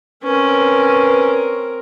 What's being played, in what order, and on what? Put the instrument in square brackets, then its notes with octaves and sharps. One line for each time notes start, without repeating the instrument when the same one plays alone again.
[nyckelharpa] C4 A#4 [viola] C#4 [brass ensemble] B4